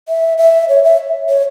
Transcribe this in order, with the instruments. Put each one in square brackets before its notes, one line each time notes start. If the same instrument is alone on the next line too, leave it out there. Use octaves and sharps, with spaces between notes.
[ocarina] E5
E5
C#5
E5
C#5